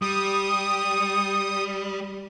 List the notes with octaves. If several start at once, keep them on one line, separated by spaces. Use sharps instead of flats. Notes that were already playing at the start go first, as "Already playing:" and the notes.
G3 D#6